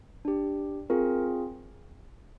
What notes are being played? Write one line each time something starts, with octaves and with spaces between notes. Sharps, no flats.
D4 G4
C4 F4 G#4 A#4